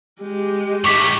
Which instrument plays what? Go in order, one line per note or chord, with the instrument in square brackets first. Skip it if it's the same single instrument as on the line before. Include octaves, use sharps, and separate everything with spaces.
[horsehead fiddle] G#3 G4
[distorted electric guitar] A2 D#3 [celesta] C#6 D6 B6